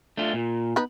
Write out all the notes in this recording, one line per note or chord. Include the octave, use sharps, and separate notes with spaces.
A3 D4 F4
A#2
B3 D#4 B4